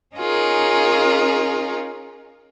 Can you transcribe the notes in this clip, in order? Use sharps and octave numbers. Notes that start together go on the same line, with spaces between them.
C#4 D#4 F4 G#4 A#4